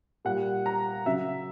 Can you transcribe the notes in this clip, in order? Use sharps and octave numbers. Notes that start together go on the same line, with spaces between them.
A#2 G3 F#5
A#5
C#3 F#3 E5